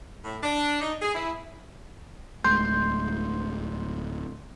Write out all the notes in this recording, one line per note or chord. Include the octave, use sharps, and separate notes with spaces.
A2
D4
D#4
G#4
E4
D1 G#3 A3 C6 G6